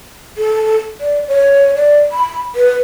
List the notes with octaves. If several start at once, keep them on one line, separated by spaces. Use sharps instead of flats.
A4
D5
C#5
D5
B5
B4